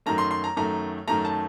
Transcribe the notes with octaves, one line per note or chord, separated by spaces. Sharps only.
F#2 D#3 A3 A#5
C6
C6
A#5
F#2 D#3 A3 A#5
F#2 D#3 A3 A#5
A5